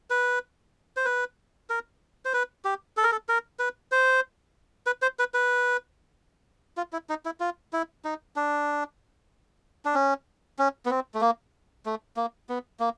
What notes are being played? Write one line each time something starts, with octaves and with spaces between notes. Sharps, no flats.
B4
C5
B4
A#4
C5
B4
G4
A4
A#4
A4
A#4
B4
C5
B4
C5
B4
B4
F4
E4
D#4
E4
F4
E4
D#4
D4
D4
C#4
C#4
B3
C4
A3
A#3
A3
A#3
B3
A#3